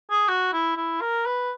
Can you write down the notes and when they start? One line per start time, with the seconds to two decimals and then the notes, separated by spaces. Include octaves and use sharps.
0.11 G#4
0.28 F#4
0.53 E4
0.77 E4
1.01 A#4
1.26 B4